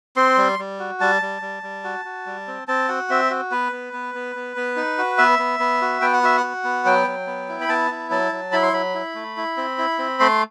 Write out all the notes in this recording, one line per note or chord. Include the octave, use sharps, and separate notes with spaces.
C4 C6
G3
G3
F#4
G3 A5
G3
G3
G3
F#4
F#4
G3
C4
C4 A5
F#4 F#5
C4 E5
F#4
B3 B4
B3
B3
B3
B3
B3
D#4
F#4
B3 E5
B3
B3
F#4
B3 G5
F#5
F#4 E5
F#5
F#4
B3
F#3 G5
F#3
B3
E4
B5
B3 A5
E4
F#3 A5
F#3
E4 B5
C6
F#3 B5
E4
A3
E4
C4
E4
C4
A3 C6